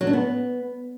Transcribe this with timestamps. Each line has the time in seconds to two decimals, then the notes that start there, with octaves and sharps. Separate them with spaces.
0.01 F#3
0.07 D4
0.13 B3